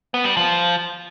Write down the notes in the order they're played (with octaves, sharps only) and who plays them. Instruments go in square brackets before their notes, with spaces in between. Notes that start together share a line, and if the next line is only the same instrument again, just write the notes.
[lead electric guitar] B3
G3
F3